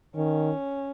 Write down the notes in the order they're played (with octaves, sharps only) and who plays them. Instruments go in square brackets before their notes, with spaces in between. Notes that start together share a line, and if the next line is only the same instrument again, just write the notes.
[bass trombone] D#3 [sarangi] C#4